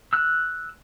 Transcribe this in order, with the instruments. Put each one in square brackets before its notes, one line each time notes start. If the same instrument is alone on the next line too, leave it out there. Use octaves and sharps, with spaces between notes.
[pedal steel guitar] E6 F#6